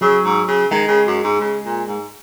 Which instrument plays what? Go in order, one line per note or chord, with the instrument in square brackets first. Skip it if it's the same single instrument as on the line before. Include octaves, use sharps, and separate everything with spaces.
[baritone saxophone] C#3 [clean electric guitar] F#3
[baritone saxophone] G#2
C#3
[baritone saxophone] D#3 [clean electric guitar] G#3
[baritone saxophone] C#3
F#2
G#2
C#3
A#2
G#2